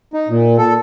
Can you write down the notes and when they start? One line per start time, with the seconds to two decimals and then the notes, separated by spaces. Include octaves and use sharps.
0.14 D#4
0.29 A#2
0.58 A4